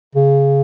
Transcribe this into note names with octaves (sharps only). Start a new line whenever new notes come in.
C#3